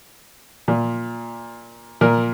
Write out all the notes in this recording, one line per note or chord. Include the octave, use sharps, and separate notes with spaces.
A#2
A#2 A#4